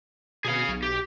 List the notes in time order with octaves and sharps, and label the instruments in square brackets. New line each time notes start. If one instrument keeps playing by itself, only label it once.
[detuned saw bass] B2 [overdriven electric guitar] G#4 F5
[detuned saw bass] B1
[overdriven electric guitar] G4